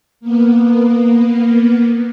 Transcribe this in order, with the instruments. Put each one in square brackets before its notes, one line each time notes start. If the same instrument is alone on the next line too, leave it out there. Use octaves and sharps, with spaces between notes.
[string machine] A#3 B3